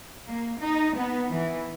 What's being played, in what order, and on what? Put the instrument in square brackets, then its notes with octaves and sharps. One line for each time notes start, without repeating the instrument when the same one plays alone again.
[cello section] A#3
D#4
B3
E3